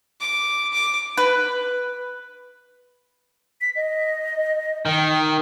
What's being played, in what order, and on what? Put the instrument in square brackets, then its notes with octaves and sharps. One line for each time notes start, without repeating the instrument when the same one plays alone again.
[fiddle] D6
D6
[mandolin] B4
[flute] B6
D#5
[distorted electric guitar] D#3 [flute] G5